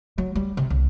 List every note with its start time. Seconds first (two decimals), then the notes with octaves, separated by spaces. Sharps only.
0.18 F#3
0.35 G3
0.57 C3
0.70 C2